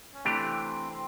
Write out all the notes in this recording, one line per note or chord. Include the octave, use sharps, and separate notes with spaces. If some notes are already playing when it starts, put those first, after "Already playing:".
C#4
C3 E3 A3 C4 D4 G4
C4